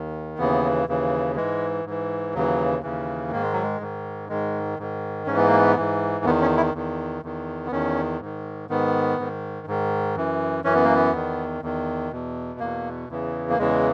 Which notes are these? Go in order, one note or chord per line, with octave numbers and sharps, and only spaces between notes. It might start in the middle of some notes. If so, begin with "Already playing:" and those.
Already playing: D#2 D#3
D#2 C#3 E3 B3
D#2 C#3 E3
G#2 E3 G#3
G#2 E3
D#2 C#3 E3 F#3
D#2 C#3 E3
G#2 D#3 A#3
G#3
F#3
G#3
G#2 D#3
G#2 D#3 G#3
G#2 D#3
G#2 E3 C#4
B3
A#3
B3
G#2 E3
E2 D#3 B3
C#4
E4
E2 D#3
E2 D#3
B3
E2 D#3 C#4
G#2 D#3
G#2 D#3 B3
G#2 D#3
G#2 D#3
F#2 E3
F#2 E3 C#4
B3
A#3
B3
E2 D#3
E2 D#3
E2 B2
E2 B2 A#3
E2 C#3 E3
A#3
E2 C#3 E3 G#3